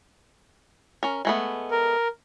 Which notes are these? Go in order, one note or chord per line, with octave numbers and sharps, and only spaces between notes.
C#4 A#4
G#3 A3 B3
A#4